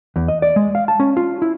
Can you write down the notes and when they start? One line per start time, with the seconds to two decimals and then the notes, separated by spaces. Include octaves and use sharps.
0.16 E2
0.28 D#5
0.42 D5
0.56 G#3
0.75 F5
0.88 A5
1.00 C#4
1.17 F4
1.42 E4